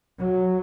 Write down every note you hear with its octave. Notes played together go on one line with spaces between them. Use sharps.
F#3